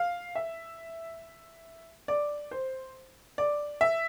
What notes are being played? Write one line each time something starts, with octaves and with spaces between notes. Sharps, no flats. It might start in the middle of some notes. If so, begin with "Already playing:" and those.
Already playing: F5
E5
D5
C5
D5
E5